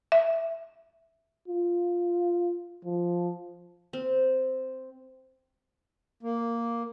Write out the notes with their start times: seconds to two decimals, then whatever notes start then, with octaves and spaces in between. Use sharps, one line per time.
0.12 E5
1.48 F4
2.85 F3
3.93 C4
6.23 A#3